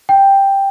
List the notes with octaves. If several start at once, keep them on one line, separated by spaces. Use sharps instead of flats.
G5